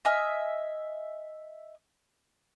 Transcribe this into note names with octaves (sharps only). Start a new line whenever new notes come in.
D#5 E5 G#5 F6